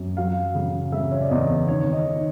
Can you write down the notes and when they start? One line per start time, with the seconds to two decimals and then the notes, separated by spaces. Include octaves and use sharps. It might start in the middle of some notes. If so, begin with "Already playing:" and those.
Already playing: F#2
0.17 F#3 F5
0.55 C#3
0.92 C#3 E5
1.12 C#5
1.21 D5
1.30 E2 D#5
1.68 D#3 C#5
1.92 D#5
2.05 D#3